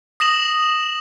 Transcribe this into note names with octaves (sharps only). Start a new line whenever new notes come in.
D#6 A#6 E7 F#7